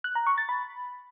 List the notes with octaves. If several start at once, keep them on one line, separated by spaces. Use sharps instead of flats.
F#6
A#5
C#6
A6
B5